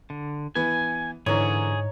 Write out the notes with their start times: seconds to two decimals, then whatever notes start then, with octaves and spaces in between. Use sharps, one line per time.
0.10 D3
0.55 E3 B3 G#5
1.26 G#2 D3 E3 D#4 G#4 C#5